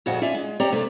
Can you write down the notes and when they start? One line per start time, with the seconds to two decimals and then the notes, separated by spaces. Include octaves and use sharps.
0.06 F2 A#2 C#3 C#4 F#4 A5
0.22 C#4 F4 D5 E5 G#5
0.34 G#3
0.60 C4 G4 C#5 D5 A#5
0.71 F#2 C3 A3 A#3 D4